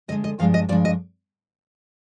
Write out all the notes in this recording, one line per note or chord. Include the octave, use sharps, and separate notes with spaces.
D2 D3 G#3 D#5
D#5
G2 F3 G#3 D4 F5
D#5
G2 F3 G#3 D4 D5
D#5